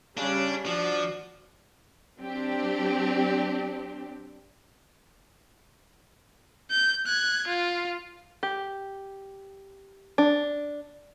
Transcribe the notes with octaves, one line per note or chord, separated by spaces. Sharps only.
C#3 G3 C#4 D4
F3 D4 F#4
F#3 C4 D4 G4
G6
F#6 G#6
F4
G4
D4